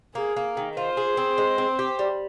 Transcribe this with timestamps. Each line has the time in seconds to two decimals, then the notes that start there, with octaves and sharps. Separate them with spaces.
0.15 A#3 G#4
0.37 A#3
0.57 D#3
0.77 F4 C5
0.97 G#4
1.17 C4
1.38 G#3
1.58 C4
1.79 G4
1.99 G3